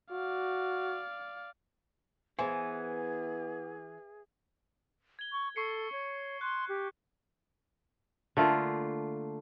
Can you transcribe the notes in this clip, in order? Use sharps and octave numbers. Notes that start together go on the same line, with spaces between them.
F#4 D5 F5
E3 B3 G#4 C5 G#5
G#6 G7
C#6
A4 C#6 C7 C#7
C#5
C6 F#6
G4
D3 A3 A#3 F4